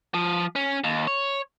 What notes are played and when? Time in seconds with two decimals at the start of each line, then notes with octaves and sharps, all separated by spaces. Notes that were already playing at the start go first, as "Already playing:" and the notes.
0.14 F3
0.56 C#4
0.84 D#2
1.07 C#5